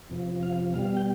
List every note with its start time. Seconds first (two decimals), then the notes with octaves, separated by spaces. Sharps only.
0.10 F2 C3 F3
0.43 F5
0.74 B2 G3 F5
0.85 F5
0.97 G5